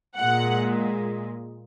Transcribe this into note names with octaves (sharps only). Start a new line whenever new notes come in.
A#2 G#3 F#5